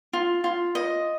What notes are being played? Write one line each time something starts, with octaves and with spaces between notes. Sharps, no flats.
F4
F4
D#5